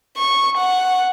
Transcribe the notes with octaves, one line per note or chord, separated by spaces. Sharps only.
C#6
F#5